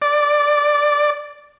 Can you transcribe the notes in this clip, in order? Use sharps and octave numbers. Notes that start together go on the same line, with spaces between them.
D5